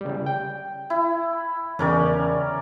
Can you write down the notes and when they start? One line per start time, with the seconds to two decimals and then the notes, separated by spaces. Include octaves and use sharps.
0.01 C#3 G3
0.26 G5
0.90 E4
1.79 E2 C#3 C#4 A#4 D5 G5